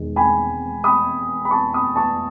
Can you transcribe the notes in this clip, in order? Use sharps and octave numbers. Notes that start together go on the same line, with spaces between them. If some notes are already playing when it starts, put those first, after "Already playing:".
Already playing: E1 E2 D#3 G#3
G#5 B5
B5 D#6
B5
A5 C#6
B5 D#6
A5 C#6